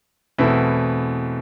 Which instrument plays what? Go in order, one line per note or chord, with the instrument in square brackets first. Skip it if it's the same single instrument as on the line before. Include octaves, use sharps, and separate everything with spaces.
[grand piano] E2 B2 A3 C4 E4